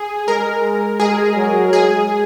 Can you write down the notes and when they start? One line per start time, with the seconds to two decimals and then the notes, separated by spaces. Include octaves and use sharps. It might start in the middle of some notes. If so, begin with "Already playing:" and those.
Already playing: G#4
0.28 G#3 A#4
1.00 G#3 G#4
1.36 F#3
1.72 G#3 G#4